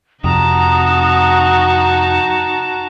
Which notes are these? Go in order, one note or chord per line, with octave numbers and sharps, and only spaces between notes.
F2 C3 D#4 F#4 A5 A#5 D#6